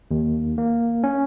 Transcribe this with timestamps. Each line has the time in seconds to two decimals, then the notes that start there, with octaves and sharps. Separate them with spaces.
0.11 D#2
0.58 A#3
1.04 C#4